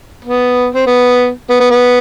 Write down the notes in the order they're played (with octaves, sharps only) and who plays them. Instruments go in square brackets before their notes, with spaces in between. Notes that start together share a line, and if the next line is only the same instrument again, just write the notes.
[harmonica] B3
C4
B3
B3
B3
B3